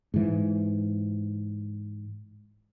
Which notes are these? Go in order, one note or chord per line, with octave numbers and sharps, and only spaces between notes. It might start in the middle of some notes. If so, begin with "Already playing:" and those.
G#2 E3